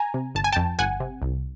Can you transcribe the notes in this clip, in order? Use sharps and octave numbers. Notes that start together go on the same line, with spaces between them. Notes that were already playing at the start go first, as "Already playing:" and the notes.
Already playing: G#5 A#5
C3
G1 A5
G#5
F2 G5 A5
G1 F#5 G#5
C3
C2